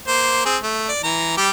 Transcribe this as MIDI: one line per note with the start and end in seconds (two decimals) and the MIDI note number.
0.07 0.42 58
0.07 0.42 72
0.46 0.57 60
0.46 0.57 68
0.63 0.89 57
0.89 1.01 74
1.03 1.36 52
1.03 1.36 82
1.38 1.51 55
1.38 1.51 67